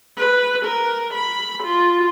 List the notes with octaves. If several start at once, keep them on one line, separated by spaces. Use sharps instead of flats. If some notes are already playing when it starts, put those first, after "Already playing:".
B4
A#4
B5
F4